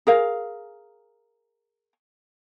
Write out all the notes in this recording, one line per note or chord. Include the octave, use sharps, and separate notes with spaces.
G#4 A#4 F5